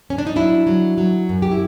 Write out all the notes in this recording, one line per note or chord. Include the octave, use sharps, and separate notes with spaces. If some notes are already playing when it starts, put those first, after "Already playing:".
C#4
D4
D#4
F#3 D4 E4
F#3
F#3
F#2
G4
E4